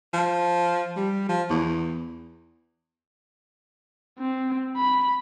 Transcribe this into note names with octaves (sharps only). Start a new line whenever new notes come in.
F3
G3
F3
E2
C4
B5